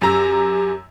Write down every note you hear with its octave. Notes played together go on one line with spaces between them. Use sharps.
F#2 G4 A#5 E6